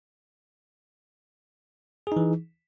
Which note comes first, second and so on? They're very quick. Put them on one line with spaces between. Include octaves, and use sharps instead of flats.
G#4 D#4 E3